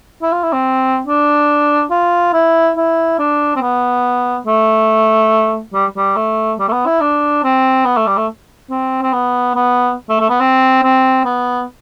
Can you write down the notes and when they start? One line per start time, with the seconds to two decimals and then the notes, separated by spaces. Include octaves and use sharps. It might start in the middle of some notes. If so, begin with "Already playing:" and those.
0.22 E4
0.32 F4
0.43 E4
0.53 C4
1.07 D4
1.91 F4
2.33 E4
2.77 E4
3.19 D4
3.56 C4
3.61 B3
4.46 A3
5.74 G3
5.97 G3
6.16 A3
6.59 G3
6.68 A3
6.72 B3
6.86 E4
7.01 D4
7.44 C4
7.85 B3
7.97 A3
8.07 G3
8.17 A3
8.70 C4
9.02 C4
9.13 B3
9.55 B3
10.09 A3
10.20 A3
10.29 B3
10.40 C4
10.83 C4
11.25 B3